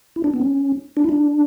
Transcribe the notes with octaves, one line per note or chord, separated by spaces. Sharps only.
E4
D4
B3
C#4
D4
E4
D4